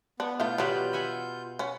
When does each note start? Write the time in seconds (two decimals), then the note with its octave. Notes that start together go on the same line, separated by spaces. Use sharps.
0.20 B3 D4
0.40 B2 A3 E4 F4 F5 G6
0.58 B2 E3 F#3 G3 B4
0.93 E5 F#5 G#5
1.59 B3 C#4